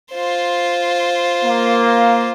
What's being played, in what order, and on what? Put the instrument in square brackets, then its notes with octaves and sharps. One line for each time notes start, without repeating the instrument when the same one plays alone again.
[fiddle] F4 C5
[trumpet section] A#3